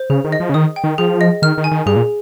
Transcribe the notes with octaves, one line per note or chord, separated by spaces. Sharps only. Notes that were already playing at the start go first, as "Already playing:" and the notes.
Already playing: C5
C#3 G#4
D#3
D#5
F3
C#3
D#3 D#6
G5
D#3
F3 G#4
D#5
D#3 F6
D#3
G#5
D#3
G2 G#4
A#2